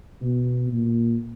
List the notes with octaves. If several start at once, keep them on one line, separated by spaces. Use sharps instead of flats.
B2
A#2